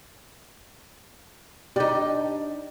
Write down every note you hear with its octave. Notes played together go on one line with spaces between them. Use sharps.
D4 D#4 G4